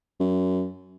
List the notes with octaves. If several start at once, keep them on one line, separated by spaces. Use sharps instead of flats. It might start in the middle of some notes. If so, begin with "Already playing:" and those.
F#2